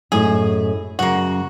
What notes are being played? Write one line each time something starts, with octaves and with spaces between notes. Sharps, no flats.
F#2 A2 D#4 G#4
F#2 C#3 F#3 A#3 F#4